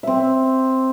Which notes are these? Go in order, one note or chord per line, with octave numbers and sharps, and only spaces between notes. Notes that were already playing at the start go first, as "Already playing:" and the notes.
C4 E5